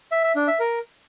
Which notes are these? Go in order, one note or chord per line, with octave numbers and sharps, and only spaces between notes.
E5
E5
D4
E5
A#4